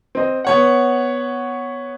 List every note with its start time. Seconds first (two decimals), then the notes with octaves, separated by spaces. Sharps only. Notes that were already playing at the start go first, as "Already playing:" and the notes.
0.15 C4 D#5
0.45 B3 C#5 F#5